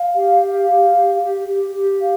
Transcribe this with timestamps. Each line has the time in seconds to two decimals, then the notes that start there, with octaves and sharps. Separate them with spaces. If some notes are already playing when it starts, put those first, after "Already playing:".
Already playing: F5
0.15 G4
0.41 F5
0.68 G4
0.94 G4
1.21 G4
1.47 G4
1.74 G4
2.00 F5